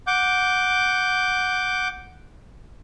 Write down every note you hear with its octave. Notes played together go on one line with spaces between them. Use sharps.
F#5 D6 G6